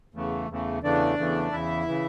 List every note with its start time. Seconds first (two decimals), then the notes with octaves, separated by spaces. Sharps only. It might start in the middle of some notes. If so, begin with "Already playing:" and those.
0.14 E2 C#3 E3 A3
0.49 E2 C#3 E3 A3
0.83 E2 C#3 E3 A3 D4 D5
1.18 E2 C#3 E3 A3
1.51 E2 C#3 E3 E4 E5
1.86 C#3 E3